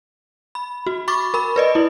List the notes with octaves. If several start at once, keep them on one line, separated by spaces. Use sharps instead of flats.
B5
F#4
B5 C#6 D6 A6
A#4 B5
B4 D5 D#5
E4